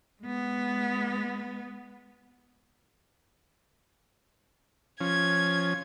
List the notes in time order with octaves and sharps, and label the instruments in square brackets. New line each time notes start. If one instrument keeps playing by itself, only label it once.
[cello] G#3 B3
[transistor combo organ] F3 C#4 [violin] G#6